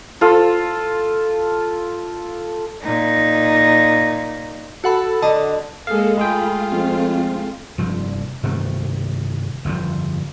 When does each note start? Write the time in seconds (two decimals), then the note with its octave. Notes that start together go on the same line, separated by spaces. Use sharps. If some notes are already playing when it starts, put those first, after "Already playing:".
0.21 F4 A4
2.82 A#2 D#4
4.84 F#4 A4 F#5 B5
5.22 D3 D#5 A5
5.87 G#3 A#3 G#4 A4 F5
6.18 G#3 A3 F4 G#4 G5 B5
6.72 F2 C4
7.78 F1 G2 F3
8.43 G2 C3 D#3 A3
9.65 G1 F2 B2 F3